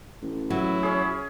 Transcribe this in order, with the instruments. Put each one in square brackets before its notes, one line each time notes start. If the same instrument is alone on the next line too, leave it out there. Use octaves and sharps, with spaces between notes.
[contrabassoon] A1
[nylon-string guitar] F#3 [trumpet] E4
[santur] C#4 G#4